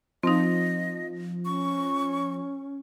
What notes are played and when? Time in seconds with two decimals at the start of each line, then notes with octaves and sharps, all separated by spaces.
0.23 F3 C4 D#4 D#5
1.45 C#4 C#6